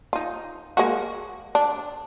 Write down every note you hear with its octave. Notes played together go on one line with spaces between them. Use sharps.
D#4 F4
G#3 A#3 F#4
D4